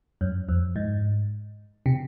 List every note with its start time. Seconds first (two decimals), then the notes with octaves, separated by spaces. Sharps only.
0.21 F#2
0.49 F2
0.76 G#2
1.86 C3